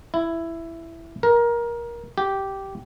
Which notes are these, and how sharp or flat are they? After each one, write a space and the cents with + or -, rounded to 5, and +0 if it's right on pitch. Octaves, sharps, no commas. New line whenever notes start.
E4 +10
A#4 +20
G4 -10